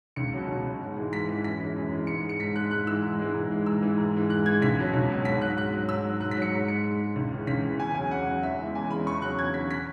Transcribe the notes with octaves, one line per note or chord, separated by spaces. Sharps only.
C#2 C#7
B2 F#3
C#2
B2 F#3
G#2
E3 G#3
G#2 B6
E3 G#3
F#2 B6
E3 G#3
F#2
E3 G#3
G#2 C#7
G#3
C#7
G#2 B6
G#3 F#6
G#2 F#6
E3 G#3 E6
G#2
E3 G#3
G#2
E3 G#3
G#2 E6
E3 G#3
G#2
E3 G#3
G#2 F#6
E3 G#3 G#6
C#2 B6
B2 F#3
C#2
B2 F#3
G#2 B6
F#3 F#6
G#2 F#6
F#3
G#2 E6
F#3
G#2 F#6
B6
F#3
C#7
G#2
G#3 C#7
G#2
G#3
C#2
C#3 E3
C#2 B6
C#3 E3
E2 G#5
C#3 F#3 G#5
E2 F#5
C#3 F#3
E2 E5
C#3 E3 G#3
E2 G#5
C#3 E3 G#3 B5
E2 C#6
C#3 F#3 F#6
E2 G#6
F#3 B6
C#3
B6